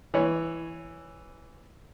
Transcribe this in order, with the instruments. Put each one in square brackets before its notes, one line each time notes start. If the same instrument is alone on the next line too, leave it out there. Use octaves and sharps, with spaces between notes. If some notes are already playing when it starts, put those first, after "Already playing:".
[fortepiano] E3 C#5